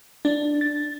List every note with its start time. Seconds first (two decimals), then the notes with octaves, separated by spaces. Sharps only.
0.25 D4
0.61 A6